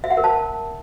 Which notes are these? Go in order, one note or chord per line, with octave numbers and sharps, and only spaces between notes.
E5
F#5
A#4
A5